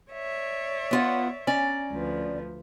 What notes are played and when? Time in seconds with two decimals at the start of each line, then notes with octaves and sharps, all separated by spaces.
0.11 C#5 D5 E5
0.91 B3 F4 F#5
1.47 C#4 D5 A#5
1.91 D2 F3 B4